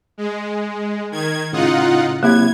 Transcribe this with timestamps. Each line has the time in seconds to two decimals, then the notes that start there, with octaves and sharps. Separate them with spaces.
0.18 G#3
1.11 D#3 G#6
1.52 A2 C#3 D#4 F4 F#5 D#6
2.23 C3 F#3 A#3 E4 G4 G#6